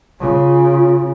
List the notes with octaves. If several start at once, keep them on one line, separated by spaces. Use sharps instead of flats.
C#3 C#4 F4